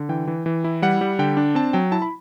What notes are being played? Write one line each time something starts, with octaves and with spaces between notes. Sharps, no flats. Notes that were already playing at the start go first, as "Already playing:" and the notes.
Already playing: D3
E3 G5
E3
E3
E4
G3 F#5
G3
D3 G5
D4
C4 A5
F#3 G5
E4 A5
B5